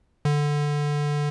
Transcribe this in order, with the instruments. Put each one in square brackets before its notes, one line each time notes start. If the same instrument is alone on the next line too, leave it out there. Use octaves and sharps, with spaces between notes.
[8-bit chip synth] D3